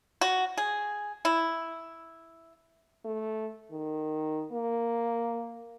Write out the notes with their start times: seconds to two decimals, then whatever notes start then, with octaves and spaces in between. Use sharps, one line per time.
0.21 F#4
0.57 G#4
1.25 E4
3.05 A3
3.72 D#3
4.52 A#3